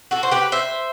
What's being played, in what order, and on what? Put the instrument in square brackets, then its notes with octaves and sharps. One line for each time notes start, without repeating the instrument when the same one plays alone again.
[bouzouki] F#4 A4
C5
G4 B4
C5 E5